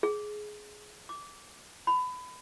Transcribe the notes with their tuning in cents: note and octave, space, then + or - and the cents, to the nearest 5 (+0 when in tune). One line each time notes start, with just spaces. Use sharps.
G#4 +15
D6 -15
B5 +25